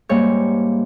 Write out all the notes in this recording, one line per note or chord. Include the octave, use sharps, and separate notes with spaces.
G#2 G3 A#3 C#5